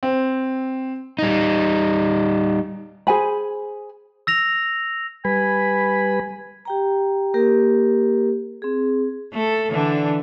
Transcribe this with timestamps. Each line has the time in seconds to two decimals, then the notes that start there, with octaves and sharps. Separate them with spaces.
0.03 C4
1.19 G3 D#4
3.07 G#4 C5 G#5 B5
4.27 E6 A#6 F7
5.25 G3 B4 G#5 B5
6.65 G4 G5 A#5
7.34 A#3 G4 A#4
8.62 C4 G#4
9.33 A3 A4
9.71 D3 E3 D4